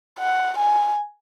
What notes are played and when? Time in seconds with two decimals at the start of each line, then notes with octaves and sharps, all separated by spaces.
0.19 F#5
0.57 G#5